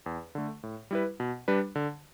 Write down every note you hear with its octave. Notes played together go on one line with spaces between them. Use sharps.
E2
D3 A3
A2
G3 E4 B4
B2
G3 D4 B4
D3